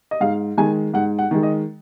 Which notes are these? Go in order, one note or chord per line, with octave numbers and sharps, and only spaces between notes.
D#5
G#2 F5
D#3 G#3 G#5
G#2 F#5
F#5
D#3 G#3
D#5